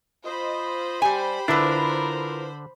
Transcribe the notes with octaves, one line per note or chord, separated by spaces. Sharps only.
F4 C5 D#5 B5
G3 G4 G#5
D3 D4 E4 F4 A#4 B4